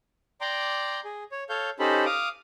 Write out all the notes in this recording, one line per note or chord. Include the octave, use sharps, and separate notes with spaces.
D5 G5 A#5 C6 D6
G#4
C#5
A4 C#5 F5 G6
C#4 D#4 G4 A4 C5 B5
F5 D6 D#6